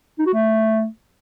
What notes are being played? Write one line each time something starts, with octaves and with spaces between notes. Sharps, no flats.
D#4
F#4
A3